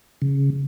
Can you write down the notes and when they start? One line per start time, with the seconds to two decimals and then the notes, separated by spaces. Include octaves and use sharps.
0.22 C#3